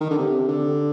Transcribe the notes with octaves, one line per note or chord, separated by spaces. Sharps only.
D#3
D3
C3
D3